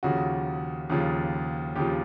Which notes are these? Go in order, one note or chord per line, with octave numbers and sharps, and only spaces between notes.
D#2 C#3 F3 F#4
D#2 C#3 F3
D#2 C#3 F3 G4